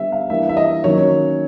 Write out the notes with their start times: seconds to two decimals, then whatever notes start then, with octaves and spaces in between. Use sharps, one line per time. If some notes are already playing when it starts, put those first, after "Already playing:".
Already playing: D3 G3 B3 E5
0.12 F5
0.30 E3 G3 A#3 D4 E5
0.49 E5
0.57 D#5
0.83 D#3 F#3 A#3 C#4 C#5